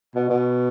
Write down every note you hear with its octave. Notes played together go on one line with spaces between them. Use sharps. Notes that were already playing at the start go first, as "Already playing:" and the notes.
B2
B2